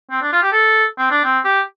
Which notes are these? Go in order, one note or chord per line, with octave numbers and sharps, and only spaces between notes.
C4
D4
F4
G4
A4
C4
D4
C4
G4